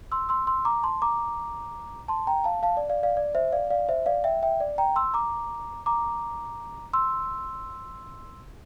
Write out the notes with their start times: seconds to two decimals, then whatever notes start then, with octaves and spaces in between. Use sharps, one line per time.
0.12 C6 E6
0.29 C6 E6
0.47 C6 E6
0.65 A#5 D6
0.83 A5 C6
1.02 A#5 D6
2.08 A5 C6
2.27 G5 A#5
2.44 F5 A5
2.63 F5 A5
2.77 D5
2.89 D5 F5
3.03 D5 F5
3.17 D5
3.35 C5 E5
3.52 D5 F5
3.70 D5 F5
3.89 C5 E5
4.06 D5 F5
4.24 E5 G5
4.43 E5 G5
4.60 D5
4.78 G5 A#5
4.96 C6 E6
5.14 A#5 D6
5.86 A#5 D6
6.93 C6 E6